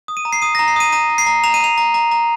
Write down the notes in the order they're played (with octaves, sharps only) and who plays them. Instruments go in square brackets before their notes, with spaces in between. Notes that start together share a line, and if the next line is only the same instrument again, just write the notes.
[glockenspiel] D#6
D#7
A#5
C7
D#6 D#7
A#6
A#5
C7
D#6 D#7
A#5 D#7
A#5
C7
A#5
A#5 F7
D#7
A#5 F7
A#5
A#5
A#5